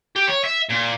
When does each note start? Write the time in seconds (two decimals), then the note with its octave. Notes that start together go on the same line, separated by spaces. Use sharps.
0.16 G4
0.28 C#5
0.45 E5
0.70 A#2